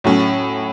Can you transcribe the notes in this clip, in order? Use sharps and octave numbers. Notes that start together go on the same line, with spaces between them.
A2 F#3 C#4